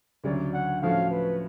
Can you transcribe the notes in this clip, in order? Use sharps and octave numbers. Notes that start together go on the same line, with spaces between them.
D2 C#3 F#3 C#4 D5
F#5
A2 F3 A3 C#4 F#4 F5
B4